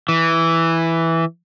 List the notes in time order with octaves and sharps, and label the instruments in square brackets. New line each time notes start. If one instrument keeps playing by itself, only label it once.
[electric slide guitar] E3